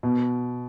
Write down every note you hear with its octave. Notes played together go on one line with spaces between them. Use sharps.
B2